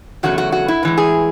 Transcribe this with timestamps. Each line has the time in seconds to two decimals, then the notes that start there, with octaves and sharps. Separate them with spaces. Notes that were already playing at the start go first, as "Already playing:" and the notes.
0.23 E2 C#3 F#3 A3 F#4
0.38 F#4
0.52 F#4
0.68 E4
0.83 A2 E3 G#3
0.98 G#4